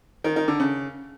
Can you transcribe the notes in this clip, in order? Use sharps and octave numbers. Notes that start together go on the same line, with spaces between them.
D#3
D#3
D3
C#3